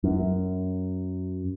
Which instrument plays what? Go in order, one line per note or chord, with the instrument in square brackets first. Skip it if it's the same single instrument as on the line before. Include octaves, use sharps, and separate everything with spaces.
[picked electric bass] F#2